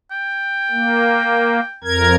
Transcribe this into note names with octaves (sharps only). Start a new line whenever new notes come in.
G5
A#3
F2 A#4 G#6